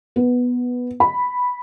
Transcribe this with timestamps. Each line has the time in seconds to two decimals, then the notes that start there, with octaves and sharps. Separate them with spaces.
0.16 B3
1.00 B5